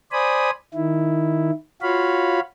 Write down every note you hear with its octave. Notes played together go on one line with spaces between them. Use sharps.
C5 D5 G#5 B5 D#6
D#3 E4
F4 F#4 C#5 F5 B5